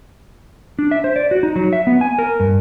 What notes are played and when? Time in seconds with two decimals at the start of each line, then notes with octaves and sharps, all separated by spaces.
0.79 D4
0.91 E5
1.04 C5
1.16 D5
1.31 F#4
1.43 D#4
1.56 F#3
1.73 E5
1.87 B3
2.01 G#5
2.18 A#4
2.40 G2